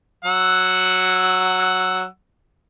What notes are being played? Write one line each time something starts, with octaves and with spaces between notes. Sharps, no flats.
F#3 F#5 E6